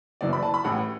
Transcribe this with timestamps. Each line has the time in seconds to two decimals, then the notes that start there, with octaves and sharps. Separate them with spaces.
0.21 F#1 F#2 E3 D5
0.33 B5
0.43 A5
0.54 B5
0.64 A1 A2 E3 F#5